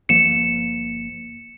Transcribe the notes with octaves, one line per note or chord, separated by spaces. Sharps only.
G1 F3 A#3 C#7 E7